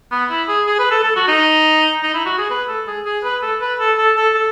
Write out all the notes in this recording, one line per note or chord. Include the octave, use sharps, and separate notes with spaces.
B3
E4
G#4
G#4
B4
A4
A4
F#4
D#4
D#4
E4
F#4
G#4
B4
A4
G#4
G#4
B4
A4
B4
A4
A4
A4
A4